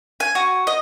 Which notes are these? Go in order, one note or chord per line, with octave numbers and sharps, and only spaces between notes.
G#5
F#4
D#5